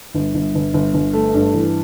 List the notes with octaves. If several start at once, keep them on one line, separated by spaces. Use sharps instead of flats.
G1
G1
G1
G1
G1
A3
G2
E3